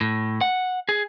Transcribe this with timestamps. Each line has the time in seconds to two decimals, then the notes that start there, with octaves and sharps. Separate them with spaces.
0.01 A2
0.41 F#5
0.89 G#4